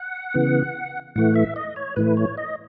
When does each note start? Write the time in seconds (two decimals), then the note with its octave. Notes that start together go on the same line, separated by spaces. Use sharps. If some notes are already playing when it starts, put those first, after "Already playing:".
Already playing: F#5
0.34 C#3 E3 B3
1.16 A2 E3 A3 F#5
1.35 E5
1.56 D#5
1.76 C#5
1.96 A2 E3 A3 B4
2.17 C#5
2.37 D#5